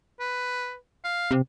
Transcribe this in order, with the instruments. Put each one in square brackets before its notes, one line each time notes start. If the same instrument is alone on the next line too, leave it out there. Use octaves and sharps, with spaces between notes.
[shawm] B4
F5
[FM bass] C3